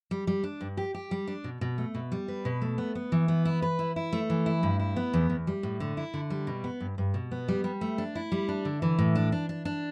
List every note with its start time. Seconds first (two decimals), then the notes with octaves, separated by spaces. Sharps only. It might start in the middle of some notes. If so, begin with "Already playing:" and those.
0.11 G3
0.27 G3
0.44 D4
0.61 G2
0.77 G4
0.94 G4
1.11 G3
1.28 D4
1.44 B2
1.61 B2
1.78 A3
1.95 B2
2.12 G3
2.28 B4
2.45 B2
2.62 A3
2.78 B3
2.95 B3
3.12 E3
3.28 B3
3.45 E4
3.62 B4
3.79 E4
3.96 E4
4.13 A3
4.30 E3
4.46 E4
4.63 G2
4.80 E4
4.96 B3
5.13 E2
5.30 E2
5.47 G3
5.63 A2
5.80 D3
5.97 E4
6.14 D3
6.30 G3
6.47 B2
6.64 B3
6.80 G2
6.98 G2
7.14 B2
7.32 B3
7.48 G3
7.64 G3
7.81 A3
7.98 D4
8.15 E4
8.32 G3
8.48 D4
8.65 D3
8.82 E3
8.99 A2
9.15 D4
9.32 D4
9.49 D4
9.65 D4